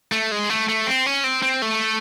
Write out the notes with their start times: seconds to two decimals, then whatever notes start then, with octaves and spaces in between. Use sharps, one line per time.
0.12 A3
0.32 G#3
0.50 A3
0.69 A3
0.87 C4
1.06 C#4
1.24 C4
1.43 C4
1.62 A3